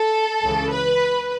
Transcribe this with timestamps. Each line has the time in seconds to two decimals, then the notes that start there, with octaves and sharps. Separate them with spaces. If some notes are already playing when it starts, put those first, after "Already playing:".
Already playing: A4
0.42 C#2 C#3 E3
0.71 B4